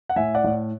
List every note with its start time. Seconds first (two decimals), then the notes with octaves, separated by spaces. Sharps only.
0.09 F#5
0.16 A2 E5 G#5
0.35 D5 F#5
0.44 A2